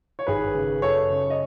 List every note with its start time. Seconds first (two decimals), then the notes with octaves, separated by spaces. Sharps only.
0.19 C#5
0.27 G#1 G#4 B4
0.55 C#3
0.82 F#2 A4 C#5
1.10 C#3
1.30 D#5